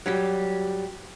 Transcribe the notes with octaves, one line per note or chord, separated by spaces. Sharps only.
F#3 G3 G4